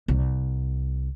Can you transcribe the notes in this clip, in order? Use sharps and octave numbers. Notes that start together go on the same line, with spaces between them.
C2